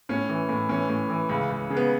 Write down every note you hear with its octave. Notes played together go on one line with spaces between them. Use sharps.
A2 C#4
E3
A2
E3 C#4
A2
E3
C#2
C#2
C#3
B3